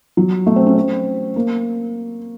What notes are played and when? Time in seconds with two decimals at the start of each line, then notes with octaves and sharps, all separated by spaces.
0.17 F#3
0.47 A3
0.56 C4
0.66 C#4
0.76 C4
1.36 A#3